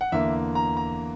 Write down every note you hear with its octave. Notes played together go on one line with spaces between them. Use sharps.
F#5
E2 D3 A#3 E5
A#5
A#5